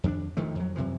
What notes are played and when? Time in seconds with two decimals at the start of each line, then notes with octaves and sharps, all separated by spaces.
0.04 F2 D#3 C#4 D4
0.37 D2 D#3 F3 A3
0.55 F2 F#3
0.76 F#2 C3 E3 F3